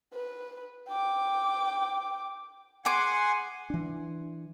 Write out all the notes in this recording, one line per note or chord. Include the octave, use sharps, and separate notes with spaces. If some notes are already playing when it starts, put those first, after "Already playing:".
B4
G5 D6
G#4 F#5 G#5 C6 D6
E3 D4